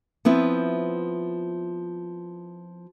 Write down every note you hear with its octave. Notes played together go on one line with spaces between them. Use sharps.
F3 B3 C4 E4